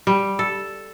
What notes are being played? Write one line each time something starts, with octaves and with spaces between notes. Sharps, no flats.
G3
A4